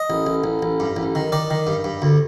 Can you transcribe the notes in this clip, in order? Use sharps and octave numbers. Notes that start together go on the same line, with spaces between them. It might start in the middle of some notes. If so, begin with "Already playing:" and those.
Already playing: D#5
A1
A1
A1
A1
G2
A1
D#3
D#3 D5
D#3
G2
G2
D2